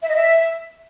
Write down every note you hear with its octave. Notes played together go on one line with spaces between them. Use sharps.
E5
D#5
E5